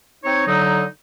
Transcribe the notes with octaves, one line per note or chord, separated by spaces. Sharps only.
C4 D#4 C#5
D3 F#3 D#4